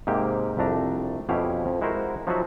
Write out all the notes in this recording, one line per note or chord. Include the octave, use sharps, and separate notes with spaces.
G#2 C3 A#3 G4
C2 F2 A3 D4 A#5
F2 B2 C#4 E4 G4 F5
F2
G#3 E4 F#4 A#4 C5
F3 F#3 D#4 F4 F#4 E5